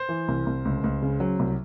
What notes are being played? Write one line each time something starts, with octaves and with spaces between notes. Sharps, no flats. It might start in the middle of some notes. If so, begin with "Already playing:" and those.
Already playing: C5
E3
C2
C2
C#2
C#2
C#3
F#3
C2